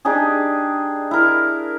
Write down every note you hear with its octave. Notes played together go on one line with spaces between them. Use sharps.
D4 D#4 G4 G#4
E4 A#4